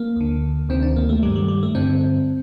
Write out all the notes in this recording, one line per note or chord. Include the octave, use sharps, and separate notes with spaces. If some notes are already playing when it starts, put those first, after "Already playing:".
Already playing: A#3
D2 D3
D2 C3 D#3 C4
D4
A#3
A3
G2 D#3 G3
G3
G3
A3
G2 D3 C4